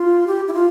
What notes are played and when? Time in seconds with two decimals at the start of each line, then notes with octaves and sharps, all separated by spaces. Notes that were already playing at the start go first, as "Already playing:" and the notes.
Already playing: F4
0.27 G4
0.48 E4
0.53 F4